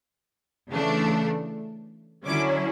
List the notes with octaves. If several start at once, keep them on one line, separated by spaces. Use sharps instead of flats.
C#3 E3 A3 D4
D3 F#3 C#4 E4 D6